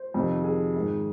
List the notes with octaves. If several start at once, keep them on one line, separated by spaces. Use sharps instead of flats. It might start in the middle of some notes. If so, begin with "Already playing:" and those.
Already playing: C5
F2 C3 D#3
G#4
G#2 D#3